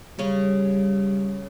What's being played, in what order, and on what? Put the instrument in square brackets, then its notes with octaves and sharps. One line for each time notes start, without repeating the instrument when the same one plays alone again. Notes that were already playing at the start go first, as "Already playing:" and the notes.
[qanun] C#3 C#4 [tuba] G3